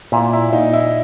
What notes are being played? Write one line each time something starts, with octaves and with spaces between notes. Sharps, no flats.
A#2 E4
E4
A#2 D#4
E4